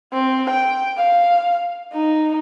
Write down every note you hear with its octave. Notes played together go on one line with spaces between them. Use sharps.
C4
G5
F5
D#4